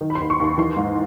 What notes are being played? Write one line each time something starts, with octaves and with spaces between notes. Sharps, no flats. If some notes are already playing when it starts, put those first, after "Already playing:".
D#3
B5
C6
D#2
C#6
D#2 C6
E3 C6
G#2